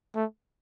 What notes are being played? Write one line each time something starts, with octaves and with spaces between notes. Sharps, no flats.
A3